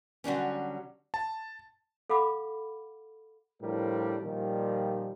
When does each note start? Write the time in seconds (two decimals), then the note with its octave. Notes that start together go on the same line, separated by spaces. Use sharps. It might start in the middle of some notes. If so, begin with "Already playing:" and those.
0.24 D3 F#3 G3 C#4
1.14 A5
2.10 A4 F5 F#5 B5 D6
3.62 A2 F3 G3 D4 A#4
4.22 A#2 D#3 F3 G3